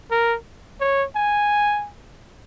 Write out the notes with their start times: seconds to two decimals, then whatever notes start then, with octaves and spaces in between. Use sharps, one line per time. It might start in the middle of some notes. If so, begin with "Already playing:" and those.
0.11 A#4
0.80 C#5
1.15 G#5